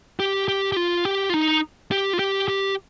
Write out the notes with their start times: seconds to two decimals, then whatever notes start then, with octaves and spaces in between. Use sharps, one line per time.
0.20 G4
0.48 G4
0.72 G4
0.76 F4
1.05 G4
1.30 F4
1.34 D#4
1.91 G4
2.13 F4
2.19 G4
2.48 G4